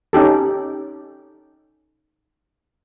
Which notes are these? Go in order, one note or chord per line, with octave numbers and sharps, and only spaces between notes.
C#4 D#4 G4 A4